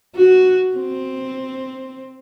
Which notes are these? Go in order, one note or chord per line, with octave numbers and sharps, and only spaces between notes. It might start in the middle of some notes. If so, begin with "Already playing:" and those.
F#4
C4